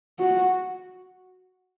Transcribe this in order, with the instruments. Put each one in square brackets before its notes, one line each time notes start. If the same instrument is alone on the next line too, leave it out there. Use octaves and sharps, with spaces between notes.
[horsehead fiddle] F#4